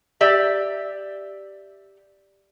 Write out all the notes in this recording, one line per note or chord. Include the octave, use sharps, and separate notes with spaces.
G4 D5 E5